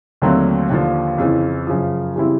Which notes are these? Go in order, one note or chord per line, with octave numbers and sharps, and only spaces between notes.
D#2 D3 F#3 A3 C4
D#2 D3 F3
F2 C#3 E3
F#2 C#3 F3
C#3 E3 G3 C4 E4